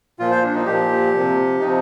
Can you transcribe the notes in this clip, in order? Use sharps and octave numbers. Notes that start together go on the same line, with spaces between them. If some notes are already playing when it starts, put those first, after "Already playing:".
A#2 F3 F4
C5
D4
D#4
A#2 F3 G4
C3 F3
C3 F3 D#4